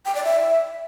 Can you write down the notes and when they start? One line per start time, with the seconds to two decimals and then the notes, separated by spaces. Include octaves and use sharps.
0.05 G5
0.15 D5
0.24 E5